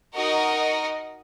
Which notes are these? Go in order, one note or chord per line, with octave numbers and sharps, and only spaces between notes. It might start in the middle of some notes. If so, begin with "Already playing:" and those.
D#4 F#4 A#4 D#5